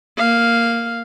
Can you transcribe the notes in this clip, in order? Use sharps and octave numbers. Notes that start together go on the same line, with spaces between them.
A#3 F5